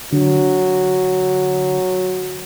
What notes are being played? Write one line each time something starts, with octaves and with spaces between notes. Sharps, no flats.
D3 F#3